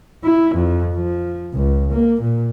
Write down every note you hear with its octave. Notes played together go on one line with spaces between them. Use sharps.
E4
F2
F3
C#2
A#3
A#2